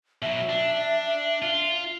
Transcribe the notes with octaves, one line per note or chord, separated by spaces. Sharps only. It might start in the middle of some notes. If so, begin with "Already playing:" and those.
B2 F#3 E5
D4
F4